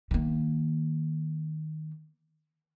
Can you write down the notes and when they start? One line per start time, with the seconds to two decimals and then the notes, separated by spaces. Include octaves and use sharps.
0.11 D#3 A#3